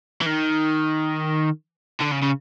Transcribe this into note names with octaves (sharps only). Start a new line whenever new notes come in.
E3
D#3
D3
C#3
C#3